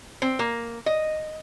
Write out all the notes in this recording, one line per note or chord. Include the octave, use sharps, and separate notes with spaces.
C4
A#3
D#5